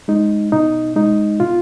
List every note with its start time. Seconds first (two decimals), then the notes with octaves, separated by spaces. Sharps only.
0.08 G#3 D#4
0.52 B2 D#4
0.96 G#3 D#4
1.40 B2 F4